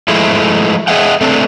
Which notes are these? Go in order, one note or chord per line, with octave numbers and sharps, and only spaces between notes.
F3 G#3 A3 E4
G#4 D#5 E5 F#5 G5
A3 C4 D4